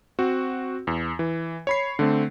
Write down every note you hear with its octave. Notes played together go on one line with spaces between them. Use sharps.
C4 F#4
E2
E3
C#5 B5 C7
D3 A3 C4